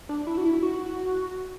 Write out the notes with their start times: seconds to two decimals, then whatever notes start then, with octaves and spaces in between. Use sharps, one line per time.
0.09 D4
0.27 E4
0.38 F#4
0.46 E4
0.63 F#4